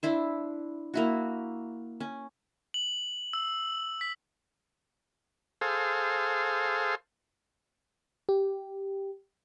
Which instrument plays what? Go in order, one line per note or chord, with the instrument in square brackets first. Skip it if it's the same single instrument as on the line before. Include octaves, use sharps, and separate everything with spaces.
[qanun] D4 E4 C5
A#3 E4 F#4
C#4
[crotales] F#7
E6
B6
[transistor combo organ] G#4 A4 C5 F5
[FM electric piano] G4